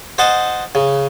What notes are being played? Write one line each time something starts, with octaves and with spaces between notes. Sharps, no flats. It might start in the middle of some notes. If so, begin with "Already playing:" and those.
C5 D#5 F#5 A5
C#3